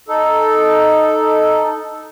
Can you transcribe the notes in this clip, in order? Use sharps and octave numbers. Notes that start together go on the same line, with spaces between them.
D#4 A4